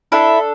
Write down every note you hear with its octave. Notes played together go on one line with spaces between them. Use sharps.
D4 E4 A4 E5